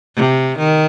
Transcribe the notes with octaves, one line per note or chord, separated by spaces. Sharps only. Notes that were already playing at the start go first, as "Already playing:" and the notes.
C3
D#3